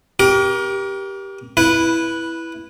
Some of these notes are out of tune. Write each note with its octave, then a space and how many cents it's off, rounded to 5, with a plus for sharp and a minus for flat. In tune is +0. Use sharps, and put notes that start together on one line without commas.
G4 +0 A#4 +30 D6 -35
E4 +0 B4 -10